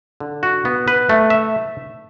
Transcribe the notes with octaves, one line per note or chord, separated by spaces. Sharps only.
D3
F#4
B3
B4
A3
E5